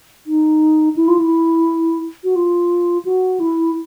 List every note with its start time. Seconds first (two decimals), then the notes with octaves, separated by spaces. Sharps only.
0.27 D#4
0.96 E4
1.08 F4
1.18 E4
2.24 F#4
2.36 F4
3.05 F#4
3.40 E4